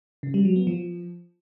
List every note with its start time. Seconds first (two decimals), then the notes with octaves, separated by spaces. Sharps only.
0.23 C#3
0.34 G3
0.45 F#3
0.56 B3
0.67 F3